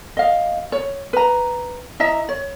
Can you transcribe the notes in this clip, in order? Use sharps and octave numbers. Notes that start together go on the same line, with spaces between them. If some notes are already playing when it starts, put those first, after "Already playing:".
D#5 F5
C#5
B4 A#5
E4 D#5 E5 A#5
C#5